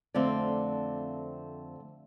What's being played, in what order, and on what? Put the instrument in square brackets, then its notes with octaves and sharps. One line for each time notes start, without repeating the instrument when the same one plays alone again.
[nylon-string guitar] F2 D3 A3 C4 D5 F5